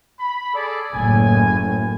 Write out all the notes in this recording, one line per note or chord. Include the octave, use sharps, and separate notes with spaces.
B5
G#4 A4 D5
F#1 A2 G#5